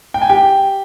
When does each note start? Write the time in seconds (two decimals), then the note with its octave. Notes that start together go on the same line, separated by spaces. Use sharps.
0.14 G5
0.22 G#5
0.30 G4 G5